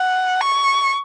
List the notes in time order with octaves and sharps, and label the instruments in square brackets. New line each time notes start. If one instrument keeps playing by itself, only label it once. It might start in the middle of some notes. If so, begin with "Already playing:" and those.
Already playing: [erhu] F#5
C#6